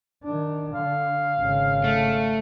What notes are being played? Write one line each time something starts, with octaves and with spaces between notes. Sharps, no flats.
D#3 D4
D3 F5
G#1 C#3
A3